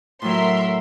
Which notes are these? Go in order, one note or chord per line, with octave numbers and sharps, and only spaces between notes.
A2 F#3 A#4 E5 C6